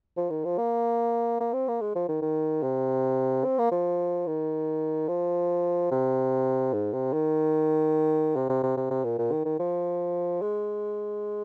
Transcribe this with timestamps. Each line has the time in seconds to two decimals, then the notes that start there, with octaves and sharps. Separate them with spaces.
0.17 F3
0.30 D#3
0.45 F3
0.58 A#3
1.40 A#3
1.53 C4
1.68 A#3
1.81 G#3
1.95 F3
2.09 D#3
2.22 D#3
2.63 C3
3.45 C4
3.59 A#3
3.72 F3
4.27 D#3
5.08 F3
5.91 C3
6.73 G#2
6.93 C3
7.13 D#3
8.36 C3
8.50 C3
8.63 C3
8.77 C3
8.91 C3
9.04 A#2
9.19 A#2
9.32 D#3
9.45 D#3
9.60 F3
10.42 G#3